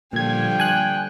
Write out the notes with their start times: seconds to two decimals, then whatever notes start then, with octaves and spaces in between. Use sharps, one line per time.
0.13 A#2 D3 F3 G3 G5 G#6
0.60 G#5 F#6